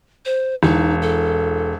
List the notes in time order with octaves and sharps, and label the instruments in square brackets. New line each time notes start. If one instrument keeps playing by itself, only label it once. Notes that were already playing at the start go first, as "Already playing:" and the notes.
[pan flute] C5
[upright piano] E1 [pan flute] D#4
[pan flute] A4